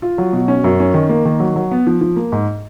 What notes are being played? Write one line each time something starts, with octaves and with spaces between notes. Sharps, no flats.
F4
F#3
B2
C#4
F#2
C#4
D#3
A#3
D#3
F#3
F#3
B3
F3
F3
A#3
G#2